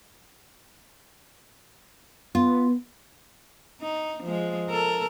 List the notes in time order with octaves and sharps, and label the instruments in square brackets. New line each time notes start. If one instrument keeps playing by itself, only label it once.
[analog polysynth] B3 [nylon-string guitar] F4
[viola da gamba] D#4
F3 G#3
A4 A#4